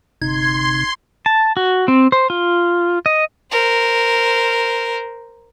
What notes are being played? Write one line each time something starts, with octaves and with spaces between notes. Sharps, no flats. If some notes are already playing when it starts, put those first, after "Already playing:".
G1 C3 D#4 C6 G#6
A5
F#4
C4
C5
F4
D#5
A#4 C5